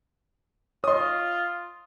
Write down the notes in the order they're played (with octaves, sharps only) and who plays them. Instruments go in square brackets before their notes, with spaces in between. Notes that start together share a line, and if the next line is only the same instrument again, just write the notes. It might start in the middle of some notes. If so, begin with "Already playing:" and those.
[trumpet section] F4 [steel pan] C#5 D#5 [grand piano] C6 D#6